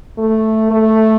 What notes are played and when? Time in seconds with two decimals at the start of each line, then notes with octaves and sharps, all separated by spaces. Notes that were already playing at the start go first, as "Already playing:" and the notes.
0.18 A3
0.71 A3